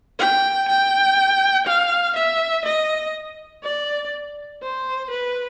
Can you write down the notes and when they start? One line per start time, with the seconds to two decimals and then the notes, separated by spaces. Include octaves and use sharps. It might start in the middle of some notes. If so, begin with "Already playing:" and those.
0.19 G5
0.69 G5
1.67 F5
2.16 E5
2.65 D#5
3.64 D5
4.62 C5
5.11 B4